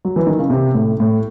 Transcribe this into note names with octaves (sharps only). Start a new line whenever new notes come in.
F#3
E3
D#3
C#3
C3
A2
A2